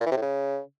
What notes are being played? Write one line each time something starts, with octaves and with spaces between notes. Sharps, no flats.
A#2
E3
C3
A2
C#3